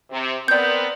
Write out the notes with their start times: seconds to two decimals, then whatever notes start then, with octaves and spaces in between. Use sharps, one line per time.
0.11 C3
0.48 B3 C4 A#4 D5 G6